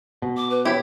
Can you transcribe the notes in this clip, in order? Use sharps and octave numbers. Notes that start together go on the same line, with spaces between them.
B2
D6
B4
E4 G4 C#5 B5